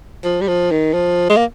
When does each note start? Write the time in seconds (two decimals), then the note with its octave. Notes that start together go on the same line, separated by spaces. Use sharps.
0.24 F3
0.41 G3
0.48 F3
0.71 D#3
0.93 F3
1.30 G#3
1.37 A#3